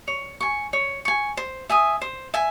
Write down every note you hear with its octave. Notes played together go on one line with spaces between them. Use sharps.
C#5
G#5 C#6
C#5
G#5 C#6
C5
E5 G#5 D#6
C5
E5 G#5